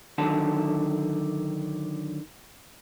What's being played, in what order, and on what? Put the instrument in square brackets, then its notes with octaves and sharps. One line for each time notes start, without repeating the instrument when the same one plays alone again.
[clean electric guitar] D3 D#3 F#3 A5